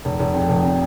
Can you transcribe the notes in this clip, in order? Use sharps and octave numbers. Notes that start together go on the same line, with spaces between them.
F1
F1
F2
F1
C3